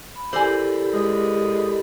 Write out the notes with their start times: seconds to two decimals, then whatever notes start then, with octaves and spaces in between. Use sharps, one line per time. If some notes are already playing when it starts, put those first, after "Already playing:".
0.15 B5
0.33 E4 G4 A4 A#4 C5 D5 G#5 B5
0.93 G#3